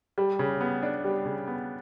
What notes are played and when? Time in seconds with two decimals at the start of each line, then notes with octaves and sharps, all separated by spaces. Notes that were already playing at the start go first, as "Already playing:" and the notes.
0.18 G3
0.39 C#3
0.61 B3
0.83 D4
1.04 G3
1.26 C#3
1.48 B3